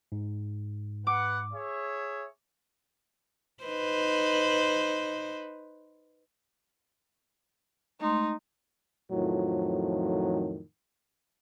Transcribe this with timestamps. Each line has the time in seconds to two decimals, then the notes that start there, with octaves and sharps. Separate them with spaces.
0.12 G#2
1.07 B4 F#5 D6
1.54 G#4 C#5 E5
3.64 D#4 B4 C5
8.00 G#3 A3 D#4 C6
9.11 F2 A2 D#3 F3 F#3